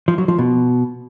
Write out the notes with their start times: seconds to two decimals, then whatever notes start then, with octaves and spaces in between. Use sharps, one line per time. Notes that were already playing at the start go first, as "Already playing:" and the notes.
0.08 F3
0.18 F#3
0.28 F3
0.38 B2